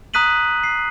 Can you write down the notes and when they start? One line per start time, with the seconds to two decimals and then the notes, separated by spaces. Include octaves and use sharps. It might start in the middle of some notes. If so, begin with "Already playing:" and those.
0.14 A#5 D#6 F#6 B6 D#7 F#7
0.64 C7